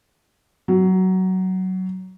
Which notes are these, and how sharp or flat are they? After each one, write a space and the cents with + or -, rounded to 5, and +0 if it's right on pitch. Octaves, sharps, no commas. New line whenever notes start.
F#3 +15